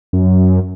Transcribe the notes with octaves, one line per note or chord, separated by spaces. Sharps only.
F#2